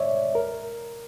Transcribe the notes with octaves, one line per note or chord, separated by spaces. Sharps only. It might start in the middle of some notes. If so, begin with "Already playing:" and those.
Already playing: C#5 D5 E5
A#4